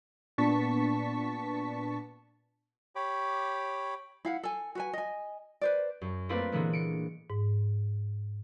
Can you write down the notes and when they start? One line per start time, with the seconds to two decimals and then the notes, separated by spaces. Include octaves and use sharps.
0.38 A#2 B3 D4 A5 C#6 B6
2.96 G4 C#5 B5 D6
4.25 E4 F5 F#5
4.43 A4 G#5
4.75 F#4 B4 G#5
4.93 D#5 G#5
5.61 B4 C5 D5
6.01 F#2
6.29 A3 A#3 C4 F4 B4 D5
6.52 A#2 D3 E3 G#3 A#3 B3
6.73 C#7 D7
7.30 G#2